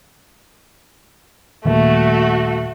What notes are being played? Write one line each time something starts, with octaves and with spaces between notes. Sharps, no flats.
D#1 D#2 A3 F#4